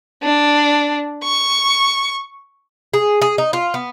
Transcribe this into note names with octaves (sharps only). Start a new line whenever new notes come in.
D4
C#6
G#4
G#4
D#4
F4
B3